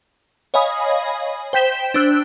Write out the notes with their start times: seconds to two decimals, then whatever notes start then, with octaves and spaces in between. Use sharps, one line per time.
0.54 C#5 D#5 F5 G#5 B5 D#6
1.53 C5 G5 G6 B6 E7 G7
1.94 D4 C5 E6 F#6